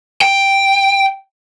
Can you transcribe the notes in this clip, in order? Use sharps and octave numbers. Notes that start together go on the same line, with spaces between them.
G5